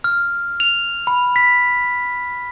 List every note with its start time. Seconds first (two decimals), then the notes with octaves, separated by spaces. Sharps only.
0.04 F6
0.60 F7
1.07 B5
1.36 B6